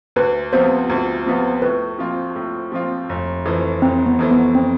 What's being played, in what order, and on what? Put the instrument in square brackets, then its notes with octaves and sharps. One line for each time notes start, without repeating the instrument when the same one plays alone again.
[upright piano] D2 [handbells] B4
[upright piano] C3 F3 B3 F4 [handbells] C5
[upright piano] D2
C3 F3 B3 F4
[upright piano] A2 [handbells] B4
[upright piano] F3 C4 F4
A2
F3 C4 F4
F1
F2 E3 A3
[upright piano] F1 [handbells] C4
[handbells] B3
[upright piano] F2 E3 A3
[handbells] B3
C4